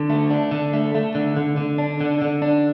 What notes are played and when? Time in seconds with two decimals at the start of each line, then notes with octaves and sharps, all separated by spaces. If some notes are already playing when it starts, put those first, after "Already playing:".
Already playing: D3
0.10 A3
0.30 D4
0.51 D3
0.73 A3
0.95 A3
1.15 D3
1.36 D3
1.57 D3
1.78 D4
2.01 D3
2.22 D3
2.42 D4